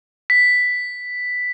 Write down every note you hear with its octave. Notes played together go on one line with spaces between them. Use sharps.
B6